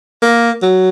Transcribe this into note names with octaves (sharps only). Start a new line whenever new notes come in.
A#3
F#3